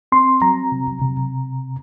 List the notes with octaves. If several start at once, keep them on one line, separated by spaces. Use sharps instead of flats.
C4 C6
F#3 A#5
C3
C3